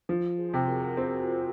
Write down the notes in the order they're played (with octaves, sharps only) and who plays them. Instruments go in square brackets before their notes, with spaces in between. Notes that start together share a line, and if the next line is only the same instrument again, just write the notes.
[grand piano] F3
[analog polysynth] G#4 C5
[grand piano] C3
[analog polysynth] F#4 A#4
[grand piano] C4 [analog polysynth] F4 G#4